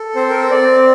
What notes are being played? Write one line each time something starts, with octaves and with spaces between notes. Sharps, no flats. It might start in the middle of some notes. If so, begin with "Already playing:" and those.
Already playing: A4
C4 C5
A#4
C5
C4 D5